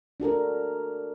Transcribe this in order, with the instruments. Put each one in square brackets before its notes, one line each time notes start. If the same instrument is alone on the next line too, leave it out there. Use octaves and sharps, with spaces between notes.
[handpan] D4 F#4 A4 A#4